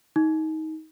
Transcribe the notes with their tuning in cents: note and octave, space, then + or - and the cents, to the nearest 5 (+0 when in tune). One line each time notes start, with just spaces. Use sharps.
D#4 +20